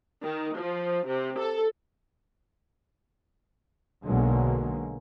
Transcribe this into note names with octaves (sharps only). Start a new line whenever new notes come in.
D#3
F3
C3
A4
B1 B2 D3 F#3 G#3 A#3